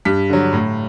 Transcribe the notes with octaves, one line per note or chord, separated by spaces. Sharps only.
G2 B6
D3 F#3
A2